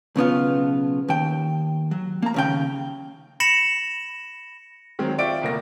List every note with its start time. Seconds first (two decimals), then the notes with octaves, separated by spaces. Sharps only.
0.16 B1 C#3 B3 F4
1.08 D#2 G5
1.91 F#3
2.22 A#3 A#5
2.34 D#2 C#3 G5
3.40 B5 A#6 C#7 E7 F#7
4.99 D#3 F#3 G#3 C4
5.18 F4 D5 E5 G5 C#6 D7
5.42 G1 C2 A#3 A#6